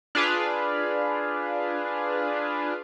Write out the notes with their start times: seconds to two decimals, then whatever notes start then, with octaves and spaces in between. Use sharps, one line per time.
0.15 D4 F4 G#4 B4 F5